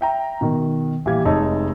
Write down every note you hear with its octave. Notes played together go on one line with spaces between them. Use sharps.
E5 G5 A#5
B2 D#3
A#1 E3 G3 G4 F5 G#6
F1 G#3 D#4 C#5 A5 E6